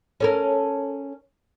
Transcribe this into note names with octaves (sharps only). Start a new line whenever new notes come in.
C#4 A4 A#4